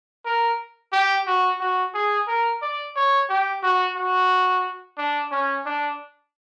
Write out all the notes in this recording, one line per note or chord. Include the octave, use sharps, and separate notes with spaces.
A#4
G4
F#4
F#4
G#4
A#4
D5
C#5
G4
F#4
F#4
D4
C#4
D4